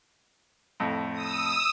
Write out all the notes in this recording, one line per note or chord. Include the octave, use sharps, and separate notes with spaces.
F2 A2
D#6 E6